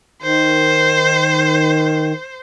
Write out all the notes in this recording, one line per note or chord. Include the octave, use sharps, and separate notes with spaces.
D#3 C5